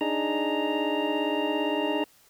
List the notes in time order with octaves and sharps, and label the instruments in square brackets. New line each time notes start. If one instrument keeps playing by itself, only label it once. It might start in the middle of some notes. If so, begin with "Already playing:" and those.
[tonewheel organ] D4 D#4 G#4 A#5